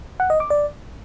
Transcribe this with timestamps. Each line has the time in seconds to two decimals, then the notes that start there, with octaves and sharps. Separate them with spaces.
0.20 F#5
0.30 D#5
0.40 D6
0.50 D5